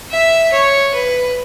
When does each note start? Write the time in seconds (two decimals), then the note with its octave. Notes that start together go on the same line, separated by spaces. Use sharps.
0.11 E5
0.52 C#5
0.94 B4